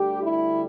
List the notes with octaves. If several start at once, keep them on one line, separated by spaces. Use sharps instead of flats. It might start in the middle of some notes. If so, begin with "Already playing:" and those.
Already playing: D2 D3 G3 G4
E4